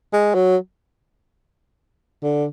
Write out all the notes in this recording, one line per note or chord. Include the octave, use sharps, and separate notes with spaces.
G#3
F#3
D3